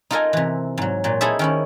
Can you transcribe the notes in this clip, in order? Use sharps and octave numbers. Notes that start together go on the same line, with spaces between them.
D#4 F4 A4 A#4 D#5 G#5
C3 E3
G#2 F#3
A#2 F#3
D#4 E4 G#4 A4 C5 E5
D#3 C#4 E4